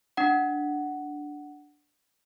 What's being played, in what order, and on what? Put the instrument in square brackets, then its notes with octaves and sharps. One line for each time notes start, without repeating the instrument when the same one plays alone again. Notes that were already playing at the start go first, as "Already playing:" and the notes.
[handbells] D4 F#5